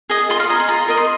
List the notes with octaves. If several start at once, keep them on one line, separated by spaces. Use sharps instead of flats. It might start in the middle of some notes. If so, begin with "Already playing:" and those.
G#4 D#5 D#6
F4 C6
F5
G#4 D#5 A#5
C6
F4 A#5
A#4 D#5
C6